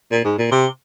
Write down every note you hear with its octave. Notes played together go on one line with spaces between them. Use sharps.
A#2
G#2
A#2
C3